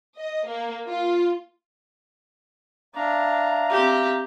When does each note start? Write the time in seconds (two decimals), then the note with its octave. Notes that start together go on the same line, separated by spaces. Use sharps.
0.17 D#5
0.48 A#3
0.88 F4
2.95 D4 E5 F5 A#5
3.70 C4 G4